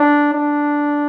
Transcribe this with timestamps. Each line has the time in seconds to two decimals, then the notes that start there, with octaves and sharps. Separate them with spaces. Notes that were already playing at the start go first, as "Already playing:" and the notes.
Already playing: D4
0.33 D4